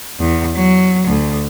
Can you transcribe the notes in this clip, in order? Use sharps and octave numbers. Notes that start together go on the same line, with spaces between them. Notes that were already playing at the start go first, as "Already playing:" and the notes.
E2
F#3
D2